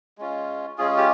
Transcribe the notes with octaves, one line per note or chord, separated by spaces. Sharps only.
G#3 C#4 F4
G#3 C#4 F4 G#4
G4